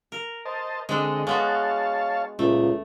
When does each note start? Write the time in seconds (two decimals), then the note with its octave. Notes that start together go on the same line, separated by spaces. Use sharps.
0.12 A#4
0.45 C5 D#5 A5
0.89 D3 G#3 C4 D4 A4 D#5
1.27 G#3 B3 F#4 C#5 F5 A5
2.39 C#2 A#2 A3